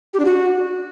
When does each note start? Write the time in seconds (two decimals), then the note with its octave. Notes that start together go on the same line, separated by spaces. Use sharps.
0.14 G4
0.19 D4
0.25 F#4